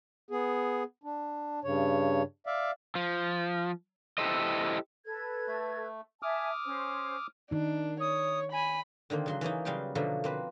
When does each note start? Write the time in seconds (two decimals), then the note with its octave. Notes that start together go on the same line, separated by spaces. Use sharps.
0.31 B3 G#4
1.03 D4
1.64 G2 C#3 C#5
2.47 D5 E5 F5
2.95 F3
4.18 E4 G4 A4 C5 D#5
5.05 A4 B4 G#6
5.47 A3
6.22 E5 G#5 A5 D6 D#6 F6
6.65 C#4 C5
7.51 D#3 D4 D#4
8.00 C#5 D#6
8.53 G#5 B5
9.10 D3 D#3 A#3 C4
9.26 C#3 F#3 C6
9.41 E3 A#3 C#4 D#4
9.65 C#3 F#3 G3 F5 G5 C6
9.95 B2 D3 F3 F#3 A3 A#3
10.24 A#3 C4 B4